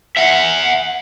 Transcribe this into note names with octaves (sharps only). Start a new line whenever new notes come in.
E5 F#5